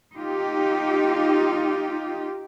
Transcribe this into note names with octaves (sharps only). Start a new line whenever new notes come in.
D#4 F4 G4